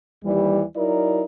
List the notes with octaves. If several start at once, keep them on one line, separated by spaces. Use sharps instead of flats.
D#2 E3 G3
F#3 D#4 E4 A#4 D5